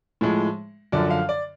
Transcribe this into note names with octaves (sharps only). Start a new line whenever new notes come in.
A2 F3 G#3
F#2 D3 F3 D5
F5
D5